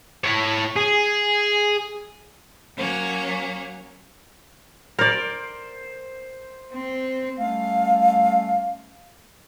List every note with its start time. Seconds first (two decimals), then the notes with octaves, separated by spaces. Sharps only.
0.24 E4 C#5
0.76 G#4
2.77 F#3 A#3 C#4
4.99 A#4 C5 D5
6.73 C4
7.40 G3 A3 C#4 F5